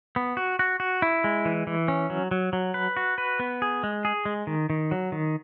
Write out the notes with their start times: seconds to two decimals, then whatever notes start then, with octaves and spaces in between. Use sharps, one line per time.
0.16 B3
0.37 F#4
0.59 F#4
0.80 F#4
1.02 E4
1.24 G#3
1.45 E3
1.67 E3
1.88 C#4
2.10 F#3
2.31 F#3
2.53 F#3
2.74 B4
2.97 F#4
3.18 B4
3.40 B3
3.62 G#4
3.83 G#3
4.05 G#4
4.25 G#3
4.47 D#3
4.70 D#3
4.91 F#3
5.12 D#3